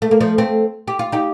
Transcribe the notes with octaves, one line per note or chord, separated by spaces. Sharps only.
A3
A#3
F3 A3
A3 C4
G4
F4
D#4 G4